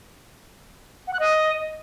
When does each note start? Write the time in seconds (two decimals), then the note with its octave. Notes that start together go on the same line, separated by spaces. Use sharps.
1.07 F#5
1.13 F#6
1.20 D#5